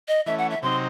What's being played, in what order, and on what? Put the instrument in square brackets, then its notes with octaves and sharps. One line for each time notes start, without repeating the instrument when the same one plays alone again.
[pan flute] D#5
[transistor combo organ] E3 A3 C#4 [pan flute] E5
[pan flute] F#5
E5
[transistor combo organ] C3 F#3 C4 D#4 [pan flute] C6